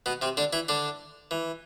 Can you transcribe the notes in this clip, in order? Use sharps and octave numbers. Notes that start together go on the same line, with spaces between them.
B2 B3
C3 C4
D3 D4
E3 E4
D3 D4
E3